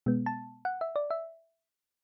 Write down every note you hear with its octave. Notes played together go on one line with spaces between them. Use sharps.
B2 G#3 B3
A5
F#5
E5
D5
E5